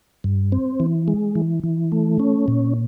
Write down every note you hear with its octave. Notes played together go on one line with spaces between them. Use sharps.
G2
C4
E3
G#3
E3
E3
A3
C#4
A#2